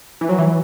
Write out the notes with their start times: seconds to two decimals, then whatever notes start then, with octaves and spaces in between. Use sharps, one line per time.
0.21 E3
0.29 F#3
0.38 E3